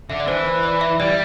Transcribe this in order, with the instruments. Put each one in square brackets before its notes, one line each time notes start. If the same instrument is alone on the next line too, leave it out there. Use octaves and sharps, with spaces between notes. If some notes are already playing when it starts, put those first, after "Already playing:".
[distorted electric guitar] D3 [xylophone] E5
[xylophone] D5
[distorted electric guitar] E3 [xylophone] C5
[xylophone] C5
D5
E5
[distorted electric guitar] G3 [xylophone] D5